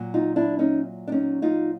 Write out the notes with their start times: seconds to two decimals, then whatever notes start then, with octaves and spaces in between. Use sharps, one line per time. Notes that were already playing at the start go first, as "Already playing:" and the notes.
Already playing: A#2 F#3
0.14 D#4 F4
0.36 D4 E4
0.59 C#4 D#4
1.07 D4
1.12 C#4 D#4
1.42 D#4 F4